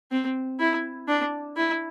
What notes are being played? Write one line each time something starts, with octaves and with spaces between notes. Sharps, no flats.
C4
E4
D4
E4